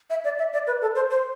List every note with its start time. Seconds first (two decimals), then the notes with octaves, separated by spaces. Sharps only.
0.10 E5
0.24 D5
0.39 E5
0.53 D5
0.67 B4
0.81 A4
0.96 C5
1.10 C5